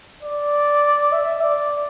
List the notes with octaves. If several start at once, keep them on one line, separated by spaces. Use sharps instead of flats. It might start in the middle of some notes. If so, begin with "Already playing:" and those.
D5
E5
D5